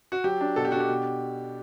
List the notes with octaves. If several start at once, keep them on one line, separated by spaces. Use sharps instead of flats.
F#4
F#3 G4
D4
B2 A4
G4
D4 F#4
G4
B2